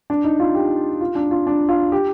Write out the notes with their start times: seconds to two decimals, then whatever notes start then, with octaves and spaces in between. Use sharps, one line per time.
0.10 D4
0.24 D#4
0.40 F4
0.55 G4
1.01 F4
1.15 D4
1.31 F4
1.47 D4
1.69 F4
1.92 G4